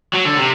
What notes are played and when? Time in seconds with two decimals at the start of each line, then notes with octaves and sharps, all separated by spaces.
0.15 F#3
0.26 D3
0.38 C3